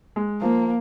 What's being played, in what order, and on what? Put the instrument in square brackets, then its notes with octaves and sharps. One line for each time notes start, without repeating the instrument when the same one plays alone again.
[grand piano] G#3
[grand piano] F3 [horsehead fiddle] A#3